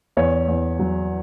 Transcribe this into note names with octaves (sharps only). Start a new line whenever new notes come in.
E2 C#5
E2
F#3